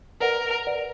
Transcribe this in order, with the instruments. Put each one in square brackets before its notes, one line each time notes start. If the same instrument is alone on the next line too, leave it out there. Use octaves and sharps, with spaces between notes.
[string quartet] A#4 [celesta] B4 D5 F#5
[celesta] B4 D5 F#5